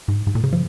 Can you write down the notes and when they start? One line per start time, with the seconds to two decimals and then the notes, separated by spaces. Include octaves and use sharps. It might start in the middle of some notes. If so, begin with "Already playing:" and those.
0.08 G#2
0.27 G#2
0.35 A#2
0.44 C#3
0.53 F3